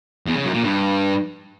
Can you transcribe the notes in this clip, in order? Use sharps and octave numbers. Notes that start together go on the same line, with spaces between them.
E2
C#3
F#2
A#2
G2